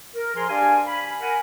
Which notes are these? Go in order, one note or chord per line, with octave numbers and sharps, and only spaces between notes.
A#4
F3 G#4 A#4 G#5 A#5 C6
D4 G4 D5 F5 G#5
B5
A#4 F#5 G#5